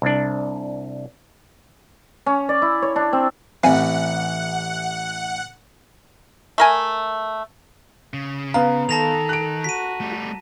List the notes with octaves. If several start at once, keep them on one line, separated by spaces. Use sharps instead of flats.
C2 D4
C#4
D5
E4
C#5
D4
C4
A1 E3 C4 F5 F#5 G#5
A3 A#4 G#5
C#3
B3 F5 A#5
D#3 A4 A5 A#6 F7
F#6 D7
F#4 B6 D#7
G3 A3